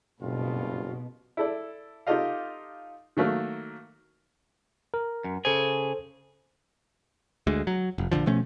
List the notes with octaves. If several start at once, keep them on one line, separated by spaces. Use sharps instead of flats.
F#1 G2 B2 C4 F4
E4 A4 D5
D#4 F4 G4 A4 D#5 F5
D#3 F#3 A3 A#3
A#4
F#2
C#3 G#4 A4 C5
D2 G#3
F#3
F1
A#1 D#2 D3 F3
B2 F3 A3 C#4